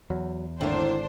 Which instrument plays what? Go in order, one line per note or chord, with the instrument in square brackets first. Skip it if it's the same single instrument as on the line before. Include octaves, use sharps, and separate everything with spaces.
[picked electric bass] E2 [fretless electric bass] F#3
[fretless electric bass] G#1 D3 [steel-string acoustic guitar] A2 A#3 [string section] D4 C5